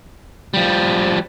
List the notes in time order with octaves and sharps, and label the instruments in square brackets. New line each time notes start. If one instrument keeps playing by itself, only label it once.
[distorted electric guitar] F3 G3